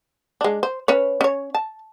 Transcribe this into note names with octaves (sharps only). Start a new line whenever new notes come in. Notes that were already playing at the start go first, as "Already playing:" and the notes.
G#3 D4
C5
C#4 B4 C#5
C#4 C#5
A5